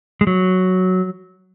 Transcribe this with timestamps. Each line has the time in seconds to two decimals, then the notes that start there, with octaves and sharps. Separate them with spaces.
0.21 G#3
0.27 F#3